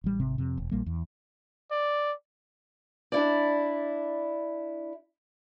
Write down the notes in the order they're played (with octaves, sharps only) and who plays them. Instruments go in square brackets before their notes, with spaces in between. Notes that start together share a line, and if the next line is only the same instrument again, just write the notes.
[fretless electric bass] A1 G3
G#1 C3 C4
F2 C3
E1
A#1 A#2 G3 A#3
E2
[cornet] D5
[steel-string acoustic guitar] D4 E4 D5